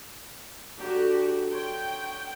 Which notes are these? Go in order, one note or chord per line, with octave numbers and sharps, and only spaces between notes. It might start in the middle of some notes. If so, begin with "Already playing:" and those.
D3 F#3 D4 F#4 G4
C#5 G5 C6